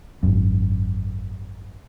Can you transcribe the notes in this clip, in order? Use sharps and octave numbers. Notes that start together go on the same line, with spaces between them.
G#1 F#2